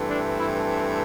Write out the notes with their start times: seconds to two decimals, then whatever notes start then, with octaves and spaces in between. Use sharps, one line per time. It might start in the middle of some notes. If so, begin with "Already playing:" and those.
Already playing: G2 E3 A3 C4
0.10 D4
0.39 E4